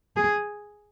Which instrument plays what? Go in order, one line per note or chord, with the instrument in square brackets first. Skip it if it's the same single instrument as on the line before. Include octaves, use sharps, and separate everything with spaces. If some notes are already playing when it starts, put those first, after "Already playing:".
[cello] G#4